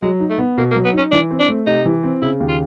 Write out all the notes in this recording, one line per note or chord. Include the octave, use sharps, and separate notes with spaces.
F#3 G#3
D#4
A3
B3
B2 A#3
A#3
F#3
B3
C#4 D#4
E3 D4
C4
D4
A3
C3 D#4
E3
C4
C#3 E4
D#2
F4